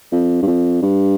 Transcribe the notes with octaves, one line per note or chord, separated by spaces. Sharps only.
F2
G2
F2
G2